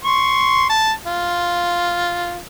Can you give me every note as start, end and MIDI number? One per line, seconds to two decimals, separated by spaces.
0.05 0.67 84
0.05 0.67 85
0.70 0.92 81
1.06 2.37 65